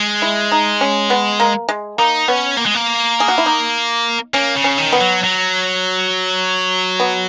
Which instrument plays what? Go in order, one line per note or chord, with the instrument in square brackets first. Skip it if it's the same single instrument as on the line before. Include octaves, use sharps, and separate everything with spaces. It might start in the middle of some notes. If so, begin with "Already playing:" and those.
Already playing: [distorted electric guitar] G#3
[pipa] E4
D#4
C#4
B3
A#3
G#3
[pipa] A#3 [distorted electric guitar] D#4
[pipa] B3 [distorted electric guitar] C#4
[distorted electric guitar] A#3
G#3
A#3
[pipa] G#4
F#4
E4
D#4
[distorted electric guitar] A#3 [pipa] C#4
[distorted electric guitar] C#3
[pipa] C#4
[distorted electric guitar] D#3
[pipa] B3
[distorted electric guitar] F#3
F#3
[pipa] B3